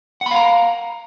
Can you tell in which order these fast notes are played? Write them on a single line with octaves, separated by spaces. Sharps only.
F#5 B5 F5 A#5